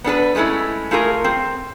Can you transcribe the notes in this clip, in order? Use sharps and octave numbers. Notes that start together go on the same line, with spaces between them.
B3 D4 A4 B4
F3 G#3 A3 C#4 E4
A3 F4 G#4 A#4
C4